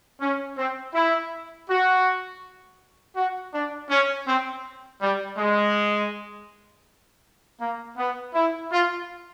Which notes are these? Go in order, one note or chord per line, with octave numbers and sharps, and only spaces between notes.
C#4
C4
E4
F#4
F#4
D4
C#4
C4
G3
G#3
A#3
B3
E4
F4